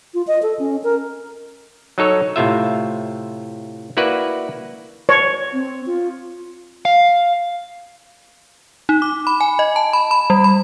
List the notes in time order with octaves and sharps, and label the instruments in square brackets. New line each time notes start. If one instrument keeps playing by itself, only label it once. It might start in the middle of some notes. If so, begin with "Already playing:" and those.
[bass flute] F4
D#5
A4
C#4
A#4
[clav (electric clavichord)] F#3 D#4 A4 C#5
A2 C3 F4 E5
A#3 E4 F#4 B4 D5
[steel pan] C#5
[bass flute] C4
F4
[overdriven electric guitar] F5
[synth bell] D#4
D6
B5
G#5
D#5
A5
B5
B5
G3
B5